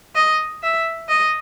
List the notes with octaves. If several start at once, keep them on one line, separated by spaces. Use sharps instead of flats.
D#5
E5
D#5